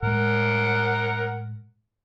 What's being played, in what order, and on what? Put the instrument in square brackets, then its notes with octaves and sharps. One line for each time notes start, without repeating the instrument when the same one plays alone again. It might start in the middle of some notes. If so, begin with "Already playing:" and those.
[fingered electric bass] A2 G#3 [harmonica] A#4 F#5